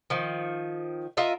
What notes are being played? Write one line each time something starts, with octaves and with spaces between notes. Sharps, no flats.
D#3 F3
F4 A#4 D#5 E5